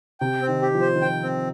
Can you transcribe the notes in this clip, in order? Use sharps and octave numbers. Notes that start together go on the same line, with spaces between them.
C3 G5
C4
D#3
G4
F3
C5
D#3
F3 G5
C4